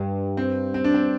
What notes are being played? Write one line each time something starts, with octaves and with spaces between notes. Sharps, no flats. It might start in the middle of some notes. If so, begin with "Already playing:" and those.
Already playing: G2
C4
C4
D4
C4